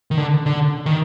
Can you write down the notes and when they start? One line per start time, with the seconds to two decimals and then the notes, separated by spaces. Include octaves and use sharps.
0.11 D#3
0.17 D3
0.46 D3
0.86 D#3